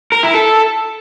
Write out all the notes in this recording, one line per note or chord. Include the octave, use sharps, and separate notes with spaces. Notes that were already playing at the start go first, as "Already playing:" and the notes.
A#4
E4
A4